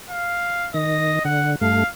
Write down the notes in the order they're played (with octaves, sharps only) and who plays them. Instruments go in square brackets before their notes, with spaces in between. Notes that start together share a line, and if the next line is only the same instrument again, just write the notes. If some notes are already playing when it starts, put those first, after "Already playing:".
[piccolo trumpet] F5
[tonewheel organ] D#3 A#6 [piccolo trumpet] D#5
[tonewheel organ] D3 [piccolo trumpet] F#5
[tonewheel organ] G2 A3 [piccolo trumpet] F5